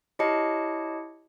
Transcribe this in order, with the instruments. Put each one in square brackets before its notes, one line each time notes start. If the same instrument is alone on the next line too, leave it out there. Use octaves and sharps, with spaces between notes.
[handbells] E4 G4 C#5 D#5 A5 C#7